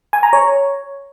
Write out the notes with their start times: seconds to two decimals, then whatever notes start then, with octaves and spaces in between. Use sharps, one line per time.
0.13 G#5
0.23 A#5
0.33 C#5